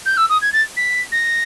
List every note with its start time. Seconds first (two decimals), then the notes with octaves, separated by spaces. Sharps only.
0.06 G6
0.17 E6
0.29 D#6
0.41 G#6
0.53 A6
0.77 B6
1.12 A#6